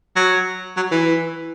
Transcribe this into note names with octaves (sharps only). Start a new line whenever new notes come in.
F#3
F#3
E3